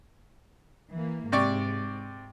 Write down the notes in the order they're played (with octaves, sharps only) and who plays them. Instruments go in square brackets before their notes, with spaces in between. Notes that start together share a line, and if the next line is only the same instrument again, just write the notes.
[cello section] E3 A#3
[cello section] G#2 [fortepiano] C3 D5 C#6